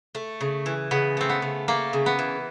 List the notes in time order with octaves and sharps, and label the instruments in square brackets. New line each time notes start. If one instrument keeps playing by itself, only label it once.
[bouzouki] A3
C#3
E3
[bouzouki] C#3 [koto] B3
[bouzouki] A3 [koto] C4
[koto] B3
[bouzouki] C#3
[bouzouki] A3 [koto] A#3
[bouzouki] C#3
[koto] B3
[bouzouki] E3